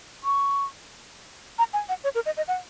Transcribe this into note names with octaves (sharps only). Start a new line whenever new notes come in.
C#6
A#5
G#5
F#5
C#5
A#4
D#5
D#5
F#5